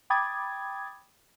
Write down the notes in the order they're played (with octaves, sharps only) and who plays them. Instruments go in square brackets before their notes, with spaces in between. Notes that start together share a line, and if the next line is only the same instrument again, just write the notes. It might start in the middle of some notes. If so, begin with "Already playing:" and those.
[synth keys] G5 B5 D6 D#6 G#6 A6